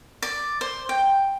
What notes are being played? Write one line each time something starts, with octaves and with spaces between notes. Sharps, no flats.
D5
C5
G5